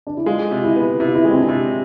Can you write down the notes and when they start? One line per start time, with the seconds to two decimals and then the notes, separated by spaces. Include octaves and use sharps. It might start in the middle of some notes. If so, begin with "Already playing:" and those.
0.07 D4
0.17 E4
0.26 G#3 F4
0.51 C3
0.63 E4
0.76 B3
0.99 C3 E4
1.07 F4
1.15 E4
1.25 G#3
1.31 C4
1.37 D4
1.49 C3